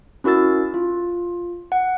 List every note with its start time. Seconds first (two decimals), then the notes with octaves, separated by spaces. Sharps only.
0.24 C#4 E4 F#4 A#4 E6 A6
0.74 F4
1.72 F#5